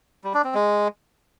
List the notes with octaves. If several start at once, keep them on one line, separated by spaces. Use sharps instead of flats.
G3
D4
C4
G#3